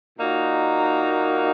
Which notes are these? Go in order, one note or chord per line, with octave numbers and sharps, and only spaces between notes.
A#2 A#3 D#4 F#4